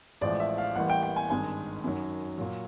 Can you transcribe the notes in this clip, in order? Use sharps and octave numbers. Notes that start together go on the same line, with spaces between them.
A1 A2 F3 G#3 D5
E5
F5
A1 A2 E3 G3 A#3 F#5
G5
G5
G#5
G#1 G2 D#3 G#3 G#5
F#2 D#3 F#3
A#2 F#3